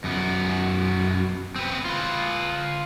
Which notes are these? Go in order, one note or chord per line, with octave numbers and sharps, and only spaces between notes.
F#2 B3
C4 B4
F4 B4